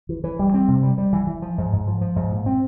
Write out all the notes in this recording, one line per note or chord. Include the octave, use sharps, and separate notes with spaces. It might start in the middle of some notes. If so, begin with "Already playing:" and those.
E3
E3
G3
C4
C3
G3
G3
E3
E3
F3
G#2
G#2
F3
F3
G#2
A#2
C4